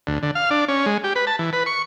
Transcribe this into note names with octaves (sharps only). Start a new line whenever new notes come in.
D2
D3
F5
D4
C#4
G#3
G4
B4
A5
E3
B4
C#6